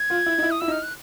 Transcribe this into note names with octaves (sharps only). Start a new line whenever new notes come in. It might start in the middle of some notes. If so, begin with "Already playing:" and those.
Already playing: G#6
F4
E4
D#4
E4
D#6
E4 E6
D#4
F6
F#6